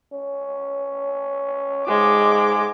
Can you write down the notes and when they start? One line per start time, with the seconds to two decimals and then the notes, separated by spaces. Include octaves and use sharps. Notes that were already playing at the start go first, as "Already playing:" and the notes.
0.12 C#4
1.88 G#2 G#3 D6